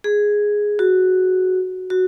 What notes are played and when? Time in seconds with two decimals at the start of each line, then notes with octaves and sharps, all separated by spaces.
0.04 G#4
0.79 F#4
1.90 F#4